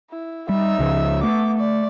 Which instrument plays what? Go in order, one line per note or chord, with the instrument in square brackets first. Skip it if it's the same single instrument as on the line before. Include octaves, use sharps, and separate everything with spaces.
[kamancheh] E4
[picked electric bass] G3 [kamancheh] D#4 E5
[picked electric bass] C#2 C#3 F3
[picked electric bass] A3 [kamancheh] B3 D6
[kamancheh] D5